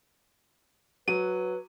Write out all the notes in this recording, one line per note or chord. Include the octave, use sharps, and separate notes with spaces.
F#3 B4 D#7